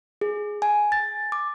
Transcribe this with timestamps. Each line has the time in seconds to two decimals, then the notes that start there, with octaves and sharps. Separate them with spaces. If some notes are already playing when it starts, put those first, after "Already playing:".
0.21 G#4
0.62 G#5
0.92 A6
1.32 D6